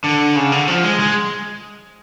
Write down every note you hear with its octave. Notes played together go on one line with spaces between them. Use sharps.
D3
C#3
D3
F3
G#3
G#3